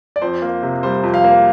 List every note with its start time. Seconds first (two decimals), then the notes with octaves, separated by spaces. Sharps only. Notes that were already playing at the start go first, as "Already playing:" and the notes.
0.16 D5
0.22 F2 C5
0.42 A#3
0.63 C3
0.83 G3 C5
1.03 F2
1.14 F5
1.24 A#3